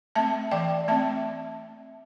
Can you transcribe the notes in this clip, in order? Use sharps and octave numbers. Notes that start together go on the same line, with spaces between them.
A3 C4 E5 A5
E3 D5 G5
A3 C4 E5 A5